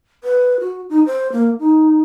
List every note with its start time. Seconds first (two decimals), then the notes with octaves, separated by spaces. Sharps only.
0.24 B4
0.60 F#4
0.90 D#4
1.06 C5
1.33 A#3
1.59 D#4